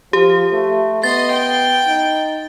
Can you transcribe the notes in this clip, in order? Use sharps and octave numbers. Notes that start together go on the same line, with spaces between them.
F3 G4
A3
B3 D#5 C6 A6
G5
D#4